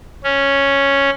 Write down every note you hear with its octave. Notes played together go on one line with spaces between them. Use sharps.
C#4